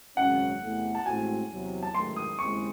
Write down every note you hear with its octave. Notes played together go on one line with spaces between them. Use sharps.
G#1 F#2 C#3 F#3 C#4 F#5
E2 C3 E3 A3
A5
A1 A2 G#3 C4 F#4 G#5
E2 C3 F#3 C4
A5
A1 G#2 D#3 F#3 A3 C6
D#6
D#2 C#3 G#3 C4 E4 C#6